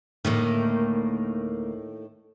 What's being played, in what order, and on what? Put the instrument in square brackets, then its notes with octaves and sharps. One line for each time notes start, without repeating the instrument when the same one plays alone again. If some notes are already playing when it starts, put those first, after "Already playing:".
[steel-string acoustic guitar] D2 A#3 [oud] A2 D#3